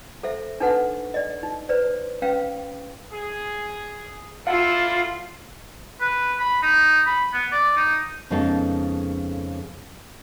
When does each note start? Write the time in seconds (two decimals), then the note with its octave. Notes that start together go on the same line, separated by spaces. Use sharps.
0.23 A4 C5 E5
0.60 D4 D#4 A4 B4 F#5
1.14 D5 D#5
1.43 D#4
1.69 B4 C5 D5
2.22 C#4 B4 F5 G5
3.12 G#4
4.47 D4 E4 F4 A4 F5 F#5
6.01 B4
6.40 B5
6.62 D#4
7.07 B5
7.33 B3
7.52 D5
7.77 D#4
8.30 F2 C#3 G#3 B3 D#4 A4